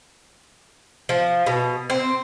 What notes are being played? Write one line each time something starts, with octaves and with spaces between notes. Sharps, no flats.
F3
B2
C4